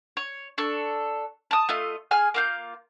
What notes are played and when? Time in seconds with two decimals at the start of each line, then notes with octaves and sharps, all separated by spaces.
0.17 C#5
0.58 D4 A4 C#6
1.51 A5 D#6
1.69 A3 F4 D#5
2.11 G#4 G#5 F6
2.34 A#3 F4 G6